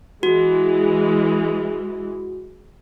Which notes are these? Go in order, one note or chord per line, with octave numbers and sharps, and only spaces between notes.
E3 G#3 F#4